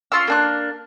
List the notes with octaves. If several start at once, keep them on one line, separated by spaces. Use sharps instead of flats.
C#4 F4 C6 E6
A#3 D4 F#6